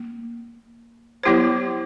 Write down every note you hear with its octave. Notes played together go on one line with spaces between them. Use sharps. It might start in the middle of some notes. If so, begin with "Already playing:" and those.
Already playing: A#3
F#3 B3 E4 G4 C5